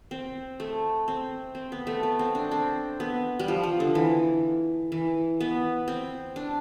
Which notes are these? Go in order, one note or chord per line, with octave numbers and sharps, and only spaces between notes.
C4
A3
C4
C4
B3
A3
B3
C4
D4
C4
B3
G3
F3
F3
D3
E3
E3
B3
C4
D4